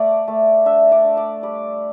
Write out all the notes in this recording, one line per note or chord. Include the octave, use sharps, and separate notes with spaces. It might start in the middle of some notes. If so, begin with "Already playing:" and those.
Already playing: A3 D5
A3
D4 E5
D5
D4
D5
G3 D5